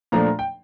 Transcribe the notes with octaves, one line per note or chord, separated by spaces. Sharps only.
A#2 F3 A3 D4 A#5
A#5
G5